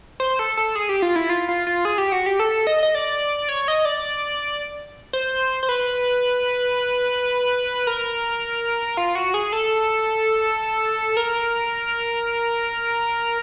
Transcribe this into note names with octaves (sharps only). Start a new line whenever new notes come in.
C5
A4
A4
G#4
G4
F4
E4
F4
F4
F4
G#4
G4
F#4
G4
A4
D#5
D#5
D5
C#5
D#5
D5
C5
C5
B4
A#4
F4
F#4
G#4
A4
A#4